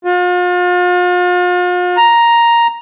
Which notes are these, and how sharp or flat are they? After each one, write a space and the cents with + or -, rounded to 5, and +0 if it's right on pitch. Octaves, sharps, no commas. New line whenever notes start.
F4 +40
A#5 +5